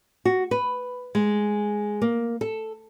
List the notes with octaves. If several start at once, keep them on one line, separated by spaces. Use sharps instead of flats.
F#4
B4
G#3
A#3
A4